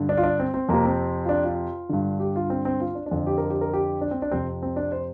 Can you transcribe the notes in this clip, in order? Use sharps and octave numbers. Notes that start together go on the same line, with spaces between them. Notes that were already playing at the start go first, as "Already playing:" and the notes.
Already playing: G2 D3
D4
F4
D4
C4
C4
F2 C3 A#3
C4
F4
D4
F4
G2 D3
G4
F4
C4
C4
F4
D4
D4
F2 D3 F4
G4
A#4
G4
A#4
G4
D4
C4
D4
F2 C3 C4
C4
D4
C5